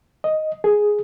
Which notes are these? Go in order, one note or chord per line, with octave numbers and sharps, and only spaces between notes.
D#5
G#4